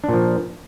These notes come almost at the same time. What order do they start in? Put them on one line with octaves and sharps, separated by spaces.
D4 A#2 F3